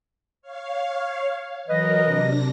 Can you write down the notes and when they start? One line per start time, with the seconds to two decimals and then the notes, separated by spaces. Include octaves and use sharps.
0.42 C#5 F5
1.68 E3 F#3 A#4 B4 D#5
2.03 C3 D4 A#6